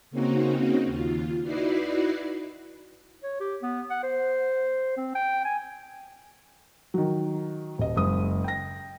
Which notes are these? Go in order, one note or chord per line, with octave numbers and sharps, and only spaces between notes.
C#3 A#3 C4 C#4 D#4 F#4
D#2 F4
D#4 E4 F#4 B4 D5 C7
C#5
G4
B3
F#5
C5
C4
G5
G#5
D#3 F#3
D#1 D#5
F#1 G#3 D#6
G5 A#6